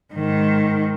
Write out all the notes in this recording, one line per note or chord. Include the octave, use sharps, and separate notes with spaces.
G#2 D#3